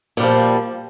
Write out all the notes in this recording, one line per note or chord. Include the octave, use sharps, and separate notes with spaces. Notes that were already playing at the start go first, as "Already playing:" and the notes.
A#2 F3 G3